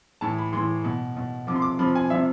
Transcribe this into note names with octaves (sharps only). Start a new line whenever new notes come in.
A2 E3 A5
B5
A2 E3 C6
B2
B2
C3 F3 D6
C6
D6
C3 F3 B5
G#5
F3 E5
C3